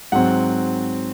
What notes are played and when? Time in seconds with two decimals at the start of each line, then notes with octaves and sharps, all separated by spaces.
0.12 G#2 F#3 C4 F#5